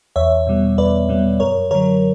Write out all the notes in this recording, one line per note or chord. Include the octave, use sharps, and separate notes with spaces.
E2 C#5 E5
B2 G3 B3
E2 B4 D5
B2 G3 B3
F#2 A#4 C#5
D3 F#3 A#4 C#5